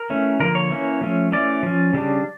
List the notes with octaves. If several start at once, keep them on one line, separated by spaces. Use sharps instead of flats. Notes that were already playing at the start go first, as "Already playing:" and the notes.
Already playing: A#4
E3 A3 C#4
D3 F3 A#3 A#4
C#5
E3 A#3 C#4
F3 A3 C#4
E3 A3 C#4 D5
F3 C#4
C#3 G3 D4